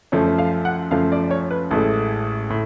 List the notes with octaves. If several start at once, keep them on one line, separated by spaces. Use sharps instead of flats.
F#2 F3 A3 C#5
F5
F#5
F#2 F3 A3 F5
D5
C#5
B4
A1 A2 G#3 A4
A2